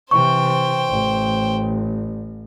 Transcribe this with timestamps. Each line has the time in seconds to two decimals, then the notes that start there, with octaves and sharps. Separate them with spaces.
0.11 C3 E3 C5 G5 C#6
0.89 A1